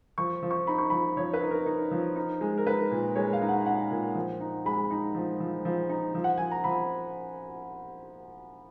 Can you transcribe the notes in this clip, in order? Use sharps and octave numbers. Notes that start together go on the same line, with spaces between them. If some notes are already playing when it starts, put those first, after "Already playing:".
F3 C#6
F3
C#6
D#4 B5
C#6
F3 B5
F3 C#5
B4
D#4
A#4
D#4
F3
D#4
G#3
A#4
D#4 B4
A#2
G#3 C#5
F5
D#4
F#5
D#4 F#5
A#2
F3
D#4
G#3 B5
D#4
F3
F3
F3
D#4
F3
F#5
F3 G#5
A#5
F3 B5